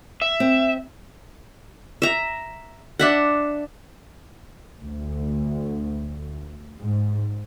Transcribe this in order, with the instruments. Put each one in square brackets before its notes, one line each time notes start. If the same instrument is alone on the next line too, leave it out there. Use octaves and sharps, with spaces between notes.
[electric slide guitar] E5
[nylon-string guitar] C4
[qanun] E5 A#5
D4 E5 F#5
[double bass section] D2
G#2